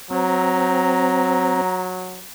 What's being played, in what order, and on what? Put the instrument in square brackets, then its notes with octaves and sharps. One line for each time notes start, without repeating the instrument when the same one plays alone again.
[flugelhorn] F#3 [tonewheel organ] C4 [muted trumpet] A#5